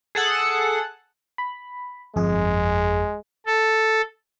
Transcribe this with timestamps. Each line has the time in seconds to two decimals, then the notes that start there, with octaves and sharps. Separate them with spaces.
0.15 G#4 A4 F#5
1.38 B5
2.16 G1 F2 G#3 G#4
3.46 A4